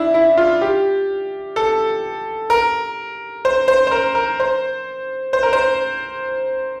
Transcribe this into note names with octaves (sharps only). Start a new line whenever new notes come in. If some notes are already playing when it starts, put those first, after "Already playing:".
Already playing: D4 E4
E4
F4
G4
A4
A#4
C5
C5
C5
A#4
A#4
C5
C5
A#4
C5